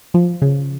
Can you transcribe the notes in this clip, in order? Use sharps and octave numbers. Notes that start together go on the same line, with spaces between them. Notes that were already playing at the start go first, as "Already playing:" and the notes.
F3
C#3